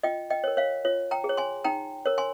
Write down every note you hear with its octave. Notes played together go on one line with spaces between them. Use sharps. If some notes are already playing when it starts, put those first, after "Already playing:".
F4 D#5 G5
D#5 G5
A#4 C#5
C#5 F5
F4 C#5
G5 A#5
G#4
C#5
G#5 C6
D#4 G5 A#5
A#4 C#5
G#5 C6